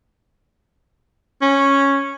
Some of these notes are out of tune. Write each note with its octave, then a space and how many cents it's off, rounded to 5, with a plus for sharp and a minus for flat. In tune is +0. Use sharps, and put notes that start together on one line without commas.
C#4 -5